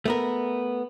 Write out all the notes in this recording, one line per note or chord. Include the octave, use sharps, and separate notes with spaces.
A3 B3 A#4